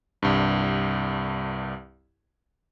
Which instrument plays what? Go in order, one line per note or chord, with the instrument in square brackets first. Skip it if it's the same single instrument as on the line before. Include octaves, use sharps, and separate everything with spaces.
[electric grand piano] C2 G2